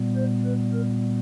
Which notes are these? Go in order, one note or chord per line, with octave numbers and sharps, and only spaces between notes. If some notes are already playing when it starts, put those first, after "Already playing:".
Already playing: A#2 G3 B3
C5
B4
A#4